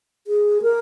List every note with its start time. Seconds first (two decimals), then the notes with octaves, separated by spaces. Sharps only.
0.27 G#4
0.62 A#4